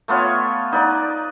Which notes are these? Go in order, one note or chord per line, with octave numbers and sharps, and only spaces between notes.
A3 B3 F4 C#5
D#4 B4 D5 A#5